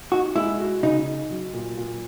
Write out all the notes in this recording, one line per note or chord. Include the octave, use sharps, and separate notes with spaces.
D#4 F#4
G#3 E4
F#4
C#3 D#4
D#4
F#3
A#2
A#2